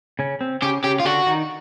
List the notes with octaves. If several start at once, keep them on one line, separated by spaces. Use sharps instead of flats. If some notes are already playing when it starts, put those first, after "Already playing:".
C#3 C#4
C4
C#3 C#4 G4
C#3 C#4 G4
F4
D3 D4 F#4
D#3 D#4